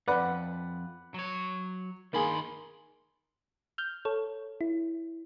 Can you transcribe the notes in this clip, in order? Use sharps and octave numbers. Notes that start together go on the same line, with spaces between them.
F2 G#2 B4 D5 F#5
F#3 C#5
D#3 A#3 G#4 B5 C6
F6 G6
A4 C#5
E4